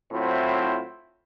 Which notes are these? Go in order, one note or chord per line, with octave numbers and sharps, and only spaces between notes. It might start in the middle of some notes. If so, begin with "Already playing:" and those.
A2 F#3 C4 E4 F4 C5